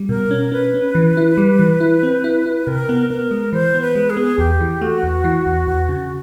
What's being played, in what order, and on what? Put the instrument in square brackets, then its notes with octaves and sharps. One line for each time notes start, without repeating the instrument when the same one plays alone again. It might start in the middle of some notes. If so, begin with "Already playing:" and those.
Already playing: [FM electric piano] G3
[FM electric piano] B2 [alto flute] A#4
[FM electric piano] C#4
[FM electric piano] C#4 [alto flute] B4
[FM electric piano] C#4
E3
E4
G3
E3
E4
C4
E4
E4
[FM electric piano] C3 [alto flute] A#4
[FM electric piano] B3
[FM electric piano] B3 [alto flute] A#4
[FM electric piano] G#3
[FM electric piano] E3 [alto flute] C5
[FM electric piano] B3
[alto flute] B4
[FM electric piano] G#3
[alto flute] G#4
[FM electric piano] B3
[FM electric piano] E2 [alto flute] G4
[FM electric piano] E3
[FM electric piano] A3 [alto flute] F#4
[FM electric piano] E2
E3
E2
E2
C#3